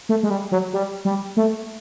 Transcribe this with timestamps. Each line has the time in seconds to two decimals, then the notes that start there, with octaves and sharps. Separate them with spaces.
0.09 A3
0.23 G#3
0.30 G3
0.52 F#3
0.73 G3
1.05 G3
1.37 A3